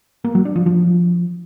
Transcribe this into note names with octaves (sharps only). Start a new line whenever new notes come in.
A#3
F#3
D4
F3
F3